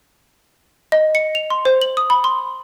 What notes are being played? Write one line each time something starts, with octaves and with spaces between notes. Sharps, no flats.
D#5
C#7
F7
C6
C5
F#7
D#6
B5
C6